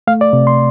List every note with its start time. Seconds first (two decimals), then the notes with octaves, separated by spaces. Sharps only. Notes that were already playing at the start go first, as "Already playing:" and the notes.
0.07 A3 F5
0.21 D5
0.33 C3
0.47 C6